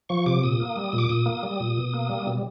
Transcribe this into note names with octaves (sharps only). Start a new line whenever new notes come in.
F3 C#6
C3 D6
A#2 D#6
A#3
G3
A#2
D6
A#2 D#6
A#3
G3
A#2
B2
A#3
G3
B2